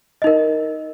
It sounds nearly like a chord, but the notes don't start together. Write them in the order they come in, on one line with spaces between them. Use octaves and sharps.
D#5 D#4 A#4